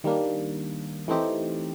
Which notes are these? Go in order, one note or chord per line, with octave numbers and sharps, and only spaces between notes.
D#3 G3 A#3 D4
E3 A3 C4 D#4 G4